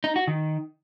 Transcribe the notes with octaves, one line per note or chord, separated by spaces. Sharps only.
D#4
F#4
D#3